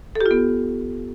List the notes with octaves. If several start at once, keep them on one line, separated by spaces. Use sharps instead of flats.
A4
G4
F4
B3